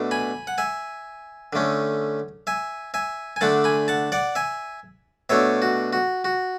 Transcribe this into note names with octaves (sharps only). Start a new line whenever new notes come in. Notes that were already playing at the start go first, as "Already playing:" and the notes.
Already playing: B2 A3 D4
G#5 B5
F#5
E5 G#5
D3 A3 C#4
E5 G#5
E5 G#5
G#5
D3 A3 D4 F#5 A5
G#5 B5
F#5 A5
D5 F#5
E5 G#5
B2 A3 D4 C#5 E5
F#4
F#4
F#4